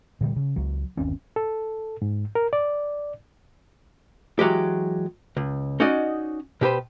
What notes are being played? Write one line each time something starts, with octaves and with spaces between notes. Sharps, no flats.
A#2 D3 E3 G3
C#3
C#2 F#3
G1 D#2 C4 C#4
A4
G#2
A#4
D5
E3 F#3 G#3 G4
C#2
C#4 D#4 F#4 D5 D#5
B2 G4 B4 C5